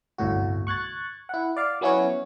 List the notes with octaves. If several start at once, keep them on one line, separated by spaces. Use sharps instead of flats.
G1 C2 A2 F#4
C#6 F#6 G#6 A6
E4 F#5
D5 F5
F#3 B3 C#4 E4 F#4 C#5